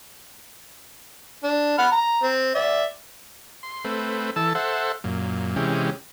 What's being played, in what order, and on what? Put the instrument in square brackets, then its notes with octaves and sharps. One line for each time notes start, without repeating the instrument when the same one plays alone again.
[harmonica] D4
F#5 B5 F6
A#5
C4
D5 E5
[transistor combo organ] C6
A3 C4 B4
E3 A4 A5 E6
A4 C5 E5 F#5
F#2 A#2
C3 E3 G#3 C#4 G4